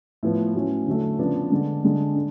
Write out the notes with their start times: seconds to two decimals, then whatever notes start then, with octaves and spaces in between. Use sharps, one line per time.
0.23 A2 F3 B3
0.55 A2 F#3 C#4
0.87 D3 F#3 A3
1.19 C#3 F3 B3 D4
1.52 D3 G#3 D4
1.84 D3 G#3 D4
2.15 D4